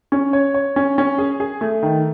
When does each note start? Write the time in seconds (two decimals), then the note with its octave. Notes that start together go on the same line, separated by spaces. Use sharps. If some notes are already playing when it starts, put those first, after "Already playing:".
0.12 C#4
0.33 C#5
0.54 C#5
0.76 C#4
0.98 C#4
1.18 G#4
1.40 G#4
1.61 A3
1.83 D#3